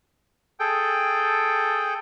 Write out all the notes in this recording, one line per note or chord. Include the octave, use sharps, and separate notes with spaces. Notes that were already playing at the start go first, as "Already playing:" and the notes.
G#4 A4 G5